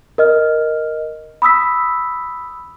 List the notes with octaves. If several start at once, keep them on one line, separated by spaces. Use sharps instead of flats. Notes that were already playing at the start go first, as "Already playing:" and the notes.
A#4 D#5 F6
B5 D#6 E6 B6